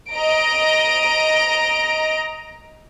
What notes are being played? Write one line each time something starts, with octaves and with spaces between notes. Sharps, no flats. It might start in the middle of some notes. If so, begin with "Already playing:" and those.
D#5 A#5 A#6 D7